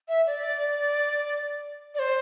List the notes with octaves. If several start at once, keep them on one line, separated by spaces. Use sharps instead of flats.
E5
D5
D5
C5